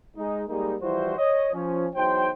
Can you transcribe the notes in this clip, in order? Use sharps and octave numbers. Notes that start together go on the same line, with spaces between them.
G#3 D#4
G3 G#3 A#3 D#4
E3 F3 G3 E4 F#4 C5
C#5 D#5
F3 C#4
E2 F#3 D#4 C5 G5